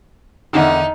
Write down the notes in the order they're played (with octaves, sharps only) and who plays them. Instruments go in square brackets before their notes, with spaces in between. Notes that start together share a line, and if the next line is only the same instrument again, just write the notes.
[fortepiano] E2 D3 D#3 [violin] D#4